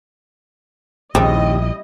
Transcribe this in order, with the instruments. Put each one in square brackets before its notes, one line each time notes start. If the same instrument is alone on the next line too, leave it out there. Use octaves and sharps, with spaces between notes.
[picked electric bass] A#1 [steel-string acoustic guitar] D#2 [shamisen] C#3 C4 G4 [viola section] G3 E4 D#5